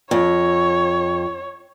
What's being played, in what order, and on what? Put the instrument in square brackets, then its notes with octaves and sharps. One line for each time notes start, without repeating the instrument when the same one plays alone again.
[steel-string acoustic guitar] F2 [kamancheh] C#5